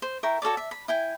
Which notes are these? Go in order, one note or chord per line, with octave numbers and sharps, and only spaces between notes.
C5
E4 A#4 G5 C#6
F#4 A4 C#5 D5
E5
B5
E4 G5 G#5